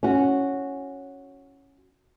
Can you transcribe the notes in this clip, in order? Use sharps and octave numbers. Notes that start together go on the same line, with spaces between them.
C#4 F#4